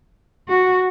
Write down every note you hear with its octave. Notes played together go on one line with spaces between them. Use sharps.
F#4